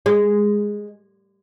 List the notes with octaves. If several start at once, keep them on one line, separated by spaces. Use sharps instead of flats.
G#3